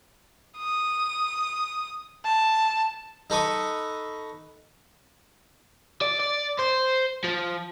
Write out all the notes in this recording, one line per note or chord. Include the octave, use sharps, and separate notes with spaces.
D#6
A5
D#4 A4 B4 C#6 D#6
D5
D5
C5
F3